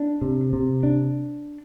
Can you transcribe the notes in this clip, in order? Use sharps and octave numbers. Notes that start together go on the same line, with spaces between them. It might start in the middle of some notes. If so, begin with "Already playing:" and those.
Already playing: D4
C3
C3
D4